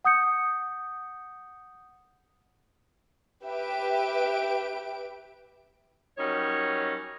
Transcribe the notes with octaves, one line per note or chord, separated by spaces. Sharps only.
F#5 D#6 G6 C#7
G4 B4 E5 D7
F#3 G3 C#4 D#4 A#4 C#5